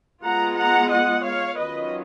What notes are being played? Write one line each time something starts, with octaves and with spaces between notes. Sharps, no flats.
G#3 B3 F4 F#5 A#5
F#5 A#5
D#5 F#5
C#5 F5
D#3 F#3 C#4 F4 B4 D#5